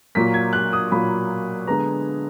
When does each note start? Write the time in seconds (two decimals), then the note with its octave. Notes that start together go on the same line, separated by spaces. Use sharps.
0.15 A#2 F#3 A#3 B6
0.34 G#6
0.53 F#6
0.73 D#6
0.91 A#2 F#3 A#3 B5
1.67 D3 G#3 B3 A#5